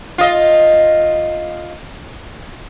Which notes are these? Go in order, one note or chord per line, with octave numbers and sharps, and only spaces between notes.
F4 D#5